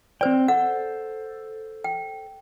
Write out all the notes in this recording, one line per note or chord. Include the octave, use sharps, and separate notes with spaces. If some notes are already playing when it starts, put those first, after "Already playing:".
C4 C5 D5 G5
A4 C5 F#5
G5